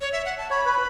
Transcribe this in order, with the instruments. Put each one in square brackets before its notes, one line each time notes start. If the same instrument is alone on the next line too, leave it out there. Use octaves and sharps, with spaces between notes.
[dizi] C#5
E5
F#5
A5
[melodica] C#5 [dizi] B5
[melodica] B4